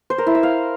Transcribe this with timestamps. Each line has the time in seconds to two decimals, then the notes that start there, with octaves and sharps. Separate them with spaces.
0.10 C5
0.18 A#4
0.27 E4
0.35 E5
0.43 F5